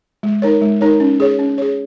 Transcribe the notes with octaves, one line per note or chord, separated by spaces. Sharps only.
G#3
D#4 A#4 C#5
G#3
D#4 A#4 C#5
C#4
G#4 C#5
C#4
G#4 C#5